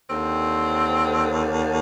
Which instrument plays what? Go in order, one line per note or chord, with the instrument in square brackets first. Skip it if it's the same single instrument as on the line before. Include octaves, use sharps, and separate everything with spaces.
[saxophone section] D#2 D3 C4